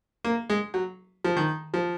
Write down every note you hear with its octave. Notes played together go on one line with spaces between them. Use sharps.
A#3
G#3
F#3
F3
D#3
F3